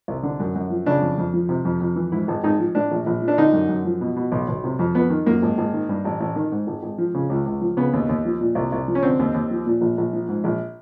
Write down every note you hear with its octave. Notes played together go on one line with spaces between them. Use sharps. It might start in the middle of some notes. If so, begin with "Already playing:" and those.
C2
D3
F#2
F#2
F3
C#3 D4
F2
F2
F3
C3
F2
F2
E3
G#2 E4
G#1
G#1 D#4
F3
A2 D4
A#1
A#1
F3
D4
D3 D#4
F#2
F#2
F3
B2
B2
B1
B1
C3
F2
F2 B3
D#3
F#2 A#3
G#1
G#1
D#3
G2
A1
A1
D#3
G#2
G#1
G#1
F3
C#3
C#2
C#2
F3
C#3 B3
D#2
D#2
F3
A#2
C2
C2
F3
C#4
D3 C4
D#2
D#2
F3
A#2
A#1
A#1
F3
G#2
A#1